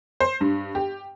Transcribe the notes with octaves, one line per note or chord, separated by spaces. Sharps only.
C5
G2
G4